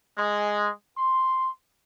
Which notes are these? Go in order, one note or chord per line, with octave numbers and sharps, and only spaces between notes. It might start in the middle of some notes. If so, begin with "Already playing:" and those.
G#3
C6